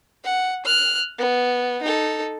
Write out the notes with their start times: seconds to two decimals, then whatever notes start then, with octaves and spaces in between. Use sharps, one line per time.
0.24 F#5
0.65 F6 F#6
1.18 B3
1.82 D#4 A4